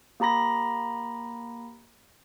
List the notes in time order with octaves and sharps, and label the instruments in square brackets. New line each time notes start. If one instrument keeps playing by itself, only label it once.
[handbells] A#3 G4 A#5 B5 A#6